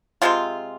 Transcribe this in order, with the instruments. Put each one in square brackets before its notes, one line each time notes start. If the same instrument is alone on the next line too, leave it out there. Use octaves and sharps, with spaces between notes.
[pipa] C3 G#3 C4 F4